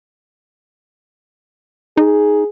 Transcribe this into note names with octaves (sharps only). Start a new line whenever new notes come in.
D#4 G#4